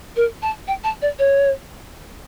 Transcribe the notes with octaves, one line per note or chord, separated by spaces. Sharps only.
A#4
A5
G5
A5
D5
C#5